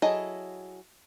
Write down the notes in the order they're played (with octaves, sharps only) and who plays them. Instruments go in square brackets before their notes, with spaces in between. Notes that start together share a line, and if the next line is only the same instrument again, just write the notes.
[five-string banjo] F#3 E4 G#4 A4 D#5